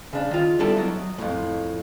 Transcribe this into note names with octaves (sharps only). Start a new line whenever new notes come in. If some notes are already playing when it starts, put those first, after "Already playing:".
C#3 D4
D#3 F4
G3 B3 D4 E4 A4 D5
F#3 D#5
F2 A2